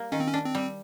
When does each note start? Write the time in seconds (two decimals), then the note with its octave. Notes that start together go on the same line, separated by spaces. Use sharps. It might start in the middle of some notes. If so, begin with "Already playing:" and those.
Already playing: G3 A#3
0.12 D#3 C#4
0.20 C4
0.27 C#4
0.34 D4
0.45 C4
0.55 G3